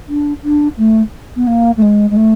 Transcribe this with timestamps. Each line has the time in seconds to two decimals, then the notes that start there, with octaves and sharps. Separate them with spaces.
0.08 D4
0.43 D4
0.77 A3
1.36 B3
1.47 A#3
1.77 A3
1.82 G#3
2.10 G#3
2.16 A3